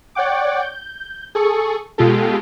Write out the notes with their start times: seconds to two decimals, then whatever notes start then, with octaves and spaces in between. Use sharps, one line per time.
0.15 C#5 D5 F#5 G5 D6
0.61 G6
1.35 G#4 A4 C#6 C#7
1.98 B2 G#3 F4 G4 A4